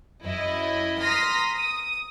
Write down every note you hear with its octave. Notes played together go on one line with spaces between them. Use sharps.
F#2 E4 D#5
A#5 C6 D#6 F6 A#6 B6
D#6